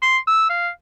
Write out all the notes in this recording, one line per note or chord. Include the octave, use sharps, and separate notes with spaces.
C6
E6
F5